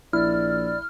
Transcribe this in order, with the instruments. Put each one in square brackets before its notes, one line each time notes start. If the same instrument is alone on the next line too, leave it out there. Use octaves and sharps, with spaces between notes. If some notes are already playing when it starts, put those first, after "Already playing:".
[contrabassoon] A#1 [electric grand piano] E4 [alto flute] D5 [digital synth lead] F6